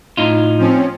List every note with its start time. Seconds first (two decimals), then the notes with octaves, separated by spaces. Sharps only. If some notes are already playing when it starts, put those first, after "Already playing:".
0.17 A2 D#4 F4
0.58 F3 C4 C#4